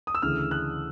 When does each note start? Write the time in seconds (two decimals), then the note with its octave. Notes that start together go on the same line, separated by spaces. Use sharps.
0.07 D#6
0.15 E6
0.22 D2 C#3 E3 F6
0.51 F#6